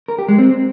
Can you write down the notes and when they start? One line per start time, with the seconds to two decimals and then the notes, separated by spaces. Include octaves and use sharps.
0.08 A#4
0.18 G4
0.29 G#3
0.39 C4